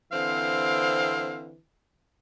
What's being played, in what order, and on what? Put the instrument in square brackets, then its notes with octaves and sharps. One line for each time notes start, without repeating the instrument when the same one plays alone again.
[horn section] D3 E3 C4 [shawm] F5